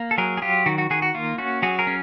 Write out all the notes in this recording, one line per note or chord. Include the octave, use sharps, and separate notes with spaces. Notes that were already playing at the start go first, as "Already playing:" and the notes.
Already playing: A#3
A4
F#3 G#4 A#4
G#4
F#3 F4 G4
D#3 F#4
F#4
D#3 F#4 G#4
F#4
A#3 F4
C#4 F#4
F#3 F#4 G#4
G#4 A#4
C#4